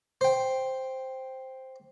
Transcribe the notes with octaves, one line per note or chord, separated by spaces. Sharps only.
C5 G5